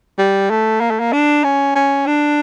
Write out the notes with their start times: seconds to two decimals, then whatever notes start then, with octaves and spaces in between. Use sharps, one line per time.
0.18 G3
0.50 A3
0.80 A#3
0.90 A3
1.00 A#3
1.13 D4
1.44 C#4
1.75 C#4
2.07 D4